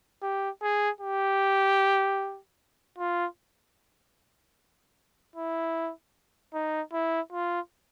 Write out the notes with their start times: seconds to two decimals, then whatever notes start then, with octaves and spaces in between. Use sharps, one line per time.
0.22 G4
0.62 G#4
1.01 G4
2.98 F4
5.36 E4
6.54 D#4
6.93 E4
7.33 F4